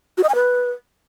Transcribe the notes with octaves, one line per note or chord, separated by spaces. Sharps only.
F#4
D#5
G#5
B4